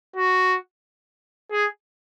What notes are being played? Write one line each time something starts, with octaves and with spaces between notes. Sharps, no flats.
F#4
G#4